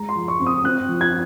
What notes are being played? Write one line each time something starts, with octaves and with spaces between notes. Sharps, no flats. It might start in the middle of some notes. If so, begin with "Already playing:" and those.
Already playing: G#3 A#5
C6
F3
C#6
C4
D#6
C4 F#6
F3
G#6